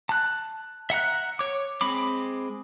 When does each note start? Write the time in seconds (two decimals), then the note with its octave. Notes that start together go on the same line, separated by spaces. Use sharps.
0.09 A5 F#6
0.90 E5 F#5 A#5 F#6
1.39 C#5 D6
1.81 G#3 C4 B5 D6